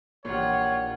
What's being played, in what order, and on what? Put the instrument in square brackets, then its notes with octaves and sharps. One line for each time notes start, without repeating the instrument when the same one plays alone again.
[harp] A#1 G4 [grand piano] A#2 E3 [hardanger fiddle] F4 F#5 [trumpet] C#5